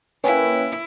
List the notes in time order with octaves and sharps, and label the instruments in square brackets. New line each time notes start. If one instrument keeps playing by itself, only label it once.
[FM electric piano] A#3 C#4 [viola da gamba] E4 [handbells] B4 G5 G#5